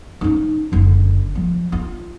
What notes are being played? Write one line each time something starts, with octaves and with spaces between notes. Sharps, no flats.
C#4 D#4
F#1 D3
F3
F4